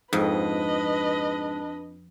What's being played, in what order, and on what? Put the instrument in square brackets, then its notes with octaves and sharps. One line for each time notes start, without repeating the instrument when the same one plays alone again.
[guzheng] F2 [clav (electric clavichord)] G#2 [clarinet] D4 [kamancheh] B4 D#5